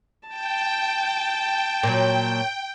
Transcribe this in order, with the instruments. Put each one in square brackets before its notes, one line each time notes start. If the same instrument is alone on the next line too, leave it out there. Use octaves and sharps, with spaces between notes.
[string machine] G5 [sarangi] A5
[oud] A#2 F#3